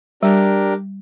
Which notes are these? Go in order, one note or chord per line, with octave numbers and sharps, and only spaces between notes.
G3 D4 G4 A#4